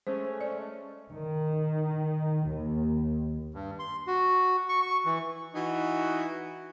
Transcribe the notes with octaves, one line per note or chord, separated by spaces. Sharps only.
G#3 A3 C#4 C5
D5
D#3
D#2
G2
C6
F#4
C#6
C#6
E3
E3 D#4 F#4